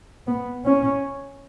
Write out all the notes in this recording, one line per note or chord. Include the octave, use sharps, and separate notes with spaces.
B3
C#4